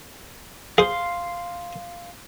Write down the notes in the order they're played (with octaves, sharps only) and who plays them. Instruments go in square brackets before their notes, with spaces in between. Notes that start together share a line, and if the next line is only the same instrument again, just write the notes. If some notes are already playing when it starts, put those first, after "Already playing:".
[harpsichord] G#4 C5 [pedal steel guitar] F5 C6